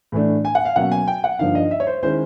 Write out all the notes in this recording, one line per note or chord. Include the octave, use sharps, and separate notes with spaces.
A2 E3 A3 D4
G#5
F#5
F5
B2 F#3 A#3 C#4 F#5
G#5
G5
F#5
G2 D3 F3 A#3 D#4 F5
D#5
E5
C#5
C5
D#3 G#3 C#4 E4 C5